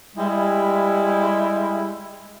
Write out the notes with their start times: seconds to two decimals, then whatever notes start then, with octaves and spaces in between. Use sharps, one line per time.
0.17 G3 G#3 E4